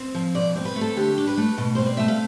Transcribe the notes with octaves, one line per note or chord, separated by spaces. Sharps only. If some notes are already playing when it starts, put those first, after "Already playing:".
Already playing: C4
F3
B2 D5
C4
B4
A3
A4
D3 G4
D4
B4
A3
B2
C4 C5
D5
A3 E5
F5